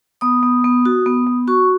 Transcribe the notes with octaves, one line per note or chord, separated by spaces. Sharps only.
B3 D#6
B3
B3
F#4
B3
B3
F#4 C#6